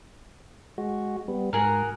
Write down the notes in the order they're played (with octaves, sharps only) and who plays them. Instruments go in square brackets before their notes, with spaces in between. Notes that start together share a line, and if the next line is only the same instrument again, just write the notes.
[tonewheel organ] G#3 F#4
G3 B3
[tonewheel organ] G#2 [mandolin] F#4 G#4 A#4